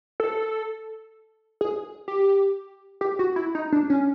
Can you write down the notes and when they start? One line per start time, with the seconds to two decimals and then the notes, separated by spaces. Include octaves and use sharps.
0.20 A4
1.61 G#4
2.08 G4
3.01 G4
3.19 F#4
3.36 E4
3.55 D#4
3.72 D4
3.90 C#4